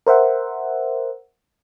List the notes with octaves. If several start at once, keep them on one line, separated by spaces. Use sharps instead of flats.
A#4 C5 E5 F#5